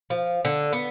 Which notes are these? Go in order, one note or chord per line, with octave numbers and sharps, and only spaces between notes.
F3
D3
B3